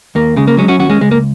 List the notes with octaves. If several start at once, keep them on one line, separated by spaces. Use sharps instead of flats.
D#2 A#3
C#3 G#3
A#3
F#3 G#3 C#4
C#4 F#4
D#2 C#4 F#4
G#3 C#4
C#2 G#3
A#3